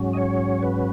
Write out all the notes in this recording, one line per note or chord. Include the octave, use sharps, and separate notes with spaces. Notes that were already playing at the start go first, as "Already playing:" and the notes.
Already playing: G#2 F#3 C#4
D#5
C#5
B4